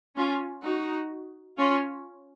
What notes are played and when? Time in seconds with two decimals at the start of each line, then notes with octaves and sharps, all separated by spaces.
0.16 C#4 F4
0.64 D#4 F#4
1.59 C#4 F4